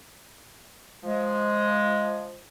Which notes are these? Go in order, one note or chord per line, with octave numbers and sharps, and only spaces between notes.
F3 G#3